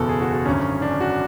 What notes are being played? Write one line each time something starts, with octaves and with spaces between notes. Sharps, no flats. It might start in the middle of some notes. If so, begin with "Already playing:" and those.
Already playing: F#1 E2 B2 A4
G#4
F#4
F#4
G#1 F#2 D3 C#4
D4
F#4